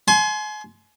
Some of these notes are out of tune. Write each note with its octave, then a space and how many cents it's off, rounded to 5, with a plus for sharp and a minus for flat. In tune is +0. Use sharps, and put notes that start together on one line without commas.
G#5 +35 C6 +0